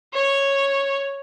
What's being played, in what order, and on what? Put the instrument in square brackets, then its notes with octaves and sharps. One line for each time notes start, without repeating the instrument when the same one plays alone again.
[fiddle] C#5